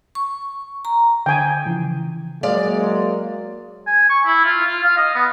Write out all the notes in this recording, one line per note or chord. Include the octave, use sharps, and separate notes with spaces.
C#6
A#5
D3 G5 G#5
C#3 E3 F3
F#3 G#3 A#3 D5 F5
G#5
C#6
E4
F4
F4
F5
D#5
B3